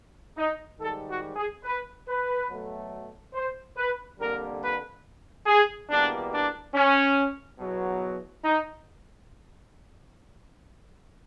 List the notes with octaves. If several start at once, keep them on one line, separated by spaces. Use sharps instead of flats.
D#4
G#2 D#3 G3 A4
F#4
G#4
B4
B4
B2 F#3 A3
C5
B4
F2 D3 G3 A#3 A#4
B4
G#4
E2 B2 G3 A#3 D4
D4
C#4
E2 B2 F#3
D#4